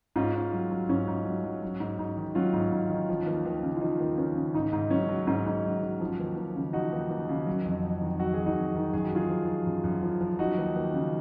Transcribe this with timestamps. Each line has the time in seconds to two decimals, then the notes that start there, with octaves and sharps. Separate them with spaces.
0.16 G#2 C#4 F4
0.34 G#2
0.53 F#3
0.71 F#3
0.89 G#2 C#4
1.08 G#2
1.25 F#3
1.44 F#3
1.62 F#3
1.80 G#2
1.99 G#2
2.17 D#3
2.35 F#3 C#4 F4
2.53 G#2
2.72 G#2
2.90 D#3
3.09 F3
3.27 D#2
3.46 D#2
3.63 C#3
3.76 F4
3.81 F3 D#4
4.00 D#2
4.18 D#2 C#4
4.36 C#3
4.54 G#2 D#4
4.73 G#2
4.91 F#3 C#4
5.09 F#3
5.27 G#2 C#4
5.46 G#2
5.64 F#3
5.82 F#3
6.00 F3
6.19 D#2
6.37 D#2
6.56 C#3
6.73 F3 D#4 F#4
6.93 D#2
7.10 D#2
7.29 C#3
7.47 F#3
7.65 F2
7.83 F2
8.02 D#3
8.19 F#3 F#4
8.33 G#4
8.39 F2
8.46 D#4 F#4
8.56 F2
8.75 D#3
8.93 F#2 G#4
9.04 F#4
9.12 F#2 F4 G#4
9.29 F3
9.48 F3
9.66 F#2
9.84 F#2
10.02 F3
10.21 F3
10.39 F#3 D#4 F#4
10.58 D#2
10.76 D#2
10.94 C#3